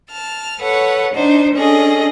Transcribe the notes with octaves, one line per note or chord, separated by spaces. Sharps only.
A5 F6
A4 B4 C#5 F#5
D4 D#4 C5
C#4 D4 G#4 A4 D#5